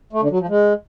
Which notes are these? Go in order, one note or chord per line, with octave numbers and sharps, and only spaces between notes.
A3
D3
F#3
F3
G#3